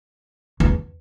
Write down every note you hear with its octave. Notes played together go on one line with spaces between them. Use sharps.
E2